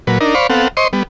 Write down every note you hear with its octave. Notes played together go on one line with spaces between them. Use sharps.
A#2 F#3 B4
D4 D#4 A#4
C5 D5 F5 B5 C#6
B3 C4 A4 F5 F#5
C5 D#5 C6 C#6
G3 B3